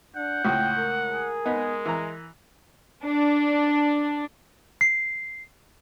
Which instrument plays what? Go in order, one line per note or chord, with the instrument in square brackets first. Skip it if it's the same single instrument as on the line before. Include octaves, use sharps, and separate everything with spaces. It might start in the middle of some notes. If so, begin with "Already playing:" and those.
[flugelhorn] D4 [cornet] F#5 [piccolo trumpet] G6
[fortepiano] C#2 A2 [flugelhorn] G5
[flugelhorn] A#4
[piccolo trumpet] G#4
[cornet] G#3 [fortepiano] B3 D#4
[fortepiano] E3 A#5
[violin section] D4
[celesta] C7